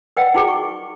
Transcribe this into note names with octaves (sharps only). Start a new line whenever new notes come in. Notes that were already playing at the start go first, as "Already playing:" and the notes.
A#4 B4 D5 D#5 F#5 G5
D#4 E4 F#4 G#4 G5 D6
C#6